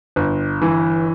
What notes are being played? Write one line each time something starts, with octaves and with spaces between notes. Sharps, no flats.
G1
E3